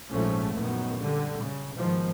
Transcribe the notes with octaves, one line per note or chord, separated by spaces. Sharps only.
A#1 G#2 F3 A3 C#4
A#1 F#2 D#3 B3
D3 G3
C#3
G#2 B2 D#3 F3